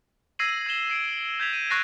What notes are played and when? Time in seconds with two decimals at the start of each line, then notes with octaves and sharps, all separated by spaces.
0.39 E6 G#6 A#6 C7 D#7 F#7
0.66 G#6 D#7 E7 G7
0.90 C7 D7
1.40 G6 G#6 B6 F7
1.53 D#7
1.70 C#6 F#6 A6 A#6 C7 D#7